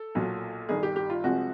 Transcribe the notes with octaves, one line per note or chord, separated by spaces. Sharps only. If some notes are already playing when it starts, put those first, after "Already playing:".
Already playing: A4
B1 A#2 F#3
G1 G2 D#3 G#4
G4
G4
F4
C2 C3 F3 G#3 F#4